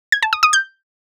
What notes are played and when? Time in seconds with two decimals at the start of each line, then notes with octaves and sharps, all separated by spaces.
0.12 G#6
0.23 A5
0.33 D#6
0.43 D#6
0.53 G6